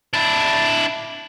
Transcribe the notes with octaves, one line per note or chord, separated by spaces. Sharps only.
D4 E4